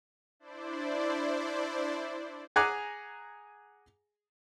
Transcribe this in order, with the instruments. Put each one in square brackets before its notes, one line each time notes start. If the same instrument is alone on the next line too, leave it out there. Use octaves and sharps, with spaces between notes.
[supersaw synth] D4 E4 C5 D5
[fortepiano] G#4 F#5 G#5 A#5 D6